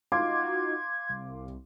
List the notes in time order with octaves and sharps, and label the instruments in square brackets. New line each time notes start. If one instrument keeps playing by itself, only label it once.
[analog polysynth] D#4 F4 F#4 [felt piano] F5 C6 D6 [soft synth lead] G#6
[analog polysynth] C2